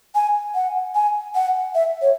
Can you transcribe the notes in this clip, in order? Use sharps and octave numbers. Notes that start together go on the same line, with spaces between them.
G#5
F#5
G#5
F#5
E5
C#5